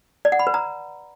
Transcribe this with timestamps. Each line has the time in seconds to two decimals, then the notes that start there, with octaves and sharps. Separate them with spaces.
0.25 D5
0.32 F#5
0.39 B5
0.47 B4
0.54 A#5